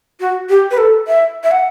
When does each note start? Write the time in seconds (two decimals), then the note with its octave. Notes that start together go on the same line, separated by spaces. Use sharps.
0.20 F#4
0.49 G4
0.71 B4
0.78 A4
1.07 E5
1.44 E5
1.51 F#5